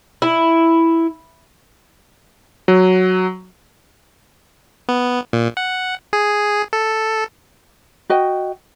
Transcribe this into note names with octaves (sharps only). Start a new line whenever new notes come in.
E4
F#3
B3
A#2
F#5
G#4
A4
F#4 D#5 G5